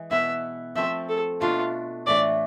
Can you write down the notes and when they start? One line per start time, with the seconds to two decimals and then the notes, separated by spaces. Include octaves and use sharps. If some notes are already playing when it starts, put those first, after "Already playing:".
Already playing: E3 G#3
0.11 B2 B3 E4 E5
0.76 F3 A3 C4 E5
1.09 A4
1.41 B2 A3 D4 F4
2.06 A2 E3 A3 D4 D5